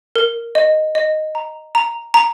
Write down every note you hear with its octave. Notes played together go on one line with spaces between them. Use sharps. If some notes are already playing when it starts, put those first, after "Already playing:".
A#4
D#5
D#5
A#5
A#5
A#5